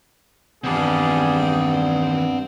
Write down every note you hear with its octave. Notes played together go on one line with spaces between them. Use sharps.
E2 G2 D#3 G3 B3 C4 G#4 A5